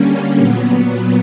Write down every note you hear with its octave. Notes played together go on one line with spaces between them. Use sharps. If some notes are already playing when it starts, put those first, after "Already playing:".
Already playing: D3 G3 A#3 C#4
A#2 F#3 B3